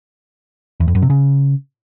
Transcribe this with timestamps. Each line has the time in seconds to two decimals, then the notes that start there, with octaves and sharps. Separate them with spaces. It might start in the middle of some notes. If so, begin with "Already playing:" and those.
0.80 E2
0.88 F2
0.95 F#2
1.02 C3
1.10 C#3